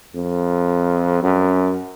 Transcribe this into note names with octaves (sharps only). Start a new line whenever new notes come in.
F2
F#2